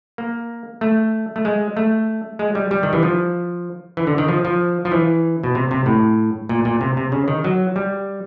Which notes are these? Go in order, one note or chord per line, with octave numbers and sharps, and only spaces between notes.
A#3
A3
A3
G#3
A3
G#3
G3
G3
D#3
E3
F3
E3
D3
D#3
F3
F3
F3
E3
B2
C3
C3
A2
A#2
A#2
C3
C3
C#3
D#3
F#3
G3